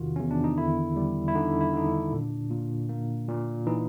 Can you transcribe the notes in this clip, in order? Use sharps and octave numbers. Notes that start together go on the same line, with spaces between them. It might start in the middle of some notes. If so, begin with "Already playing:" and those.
Already playing: E2 C3 D#3 F4 F#4
E2 C#4
D4
D#4
D3 E4
G3
E4
D3 D#4
E4
D3 D#4
D4
A#2
A#2
A#3
A#2
E3 D#4